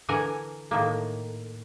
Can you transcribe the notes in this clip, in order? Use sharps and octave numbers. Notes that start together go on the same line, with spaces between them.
D3 E3 A#4 F#5 G#5 A#5
A2 D#3 A#3